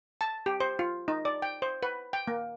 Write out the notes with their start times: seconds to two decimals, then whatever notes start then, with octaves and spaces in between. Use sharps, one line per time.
0.21 A5
0.46 G4
0.60 C5
0.79 F4
1.08 D#4
1.25 D5
1.42 G5
1.62 C5
1.83 B4
2.13 G5
2.28 A#3